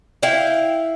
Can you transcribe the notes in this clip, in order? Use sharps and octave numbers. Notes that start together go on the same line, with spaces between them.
E4 F5 G5